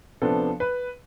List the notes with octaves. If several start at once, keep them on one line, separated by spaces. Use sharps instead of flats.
C3 F3 B3 D4 A4
B4